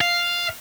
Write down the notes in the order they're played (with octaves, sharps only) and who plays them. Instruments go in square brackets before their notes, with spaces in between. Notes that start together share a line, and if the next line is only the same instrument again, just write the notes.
[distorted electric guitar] F5